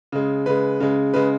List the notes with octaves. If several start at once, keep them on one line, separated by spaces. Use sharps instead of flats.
C#3 G#3
C#3 G#3 B4
C#3 G#3
C#3 G#3 B4